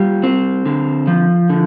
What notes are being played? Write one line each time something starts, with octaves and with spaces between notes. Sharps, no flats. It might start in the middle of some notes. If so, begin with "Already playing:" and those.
Already playing: G3 F4
C4
D3
F3
D3